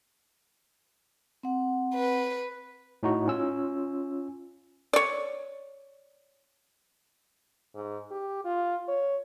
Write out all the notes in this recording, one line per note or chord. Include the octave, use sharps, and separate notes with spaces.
C4 F#5
B4
A2 D#4 F#4
C#4 F4 E6
C#5 D5
G#2
G4
F4
C#5